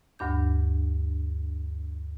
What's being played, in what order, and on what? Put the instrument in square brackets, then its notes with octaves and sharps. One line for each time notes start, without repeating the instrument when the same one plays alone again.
[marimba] D2 G2 D4 G6